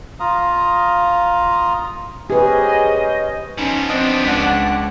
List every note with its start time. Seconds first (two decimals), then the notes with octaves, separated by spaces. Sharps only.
0.20 F4 F5 A#5 D#6
2.30 C#4 G4 G#4 B4 C5 D#5
3.58 F3 B3 C#4 D#4
3.90 C4 D4 D#5
4.25 C#2 D5 F#5 B6